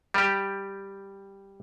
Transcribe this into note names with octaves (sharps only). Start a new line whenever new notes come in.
G3 G4